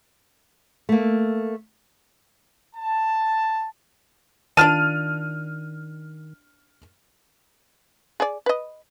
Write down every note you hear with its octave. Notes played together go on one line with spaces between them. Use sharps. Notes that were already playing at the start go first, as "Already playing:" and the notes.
A3 A#3
A5
D#3 D4 F4 A5 F6 D#7
G#4 D5
B4 D#5